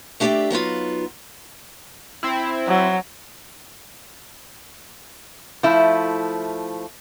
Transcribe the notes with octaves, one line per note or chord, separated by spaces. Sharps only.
A3 D4 G4 D5 E5 G5
F#3 B3 D#4 F4
C4 E4
F#3
F3 A3 E4